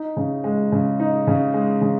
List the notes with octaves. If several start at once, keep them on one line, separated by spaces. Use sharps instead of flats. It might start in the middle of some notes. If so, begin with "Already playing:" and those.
Already playing: D#4
C#3
G#3
C#3
D#4
C#3
G#3
C#3